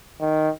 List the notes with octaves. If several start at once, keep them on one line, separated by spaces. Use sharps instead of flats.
D#3